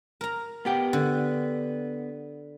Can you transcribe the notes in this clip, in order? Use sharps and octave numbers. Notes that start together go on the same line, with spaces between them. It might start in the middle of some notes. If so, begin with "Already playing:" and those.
A#4 A#5
B3 G4 G5
D3